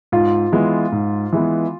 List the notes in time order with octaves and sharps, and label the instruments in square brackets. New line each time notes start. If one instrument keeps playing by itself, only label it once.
[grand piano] G#2 [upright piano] F4
[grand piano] E3 G#3 B3
G#2
E3 G#3 B3